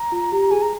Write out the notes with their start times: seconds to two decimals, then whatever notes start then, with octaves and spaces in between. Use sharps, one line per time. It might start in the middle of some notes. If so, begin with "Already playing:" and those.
Already playing: A#5
0.12 F4
0.32 G4
0.51 G#4 G#5
0.62 A#5